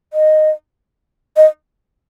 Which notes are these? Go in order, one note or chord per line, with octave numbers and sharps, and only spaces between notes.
D#5
D#5